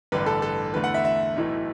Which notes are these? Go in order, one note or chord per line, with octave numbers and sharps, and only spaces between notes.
A1 G2 D3 B4
A4
A4
E2 D3 A3 B4
F#5
E5
E5
B1 A2 E3 A3